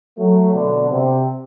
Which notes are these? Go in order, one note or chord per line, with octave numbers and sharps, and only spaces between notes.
F#3 A3
B2 D3
C3